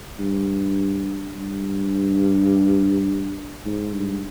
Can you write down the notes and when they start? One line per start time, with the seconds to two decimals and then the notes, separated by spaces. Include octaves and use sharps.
0.19 G2
1.35 G2
3.65 G#2
3.94 G2